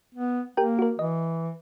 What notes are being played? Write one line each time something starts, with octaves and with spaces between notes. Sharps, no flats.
B3
A#3 G4 A#4 G5
F#4 A#4
E3 D#5